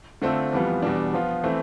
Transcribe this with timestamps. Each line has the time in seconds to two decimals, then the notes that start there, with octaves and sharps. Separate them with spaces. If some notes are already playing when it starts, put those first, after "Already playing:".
0.22 D3 A3 C4 F4 A4
0.52 F2 E3 G3 B3 F4
0.82 E2 B2 G3 D4
1.13 F3 B3 F4
1.44 E3 A3 C4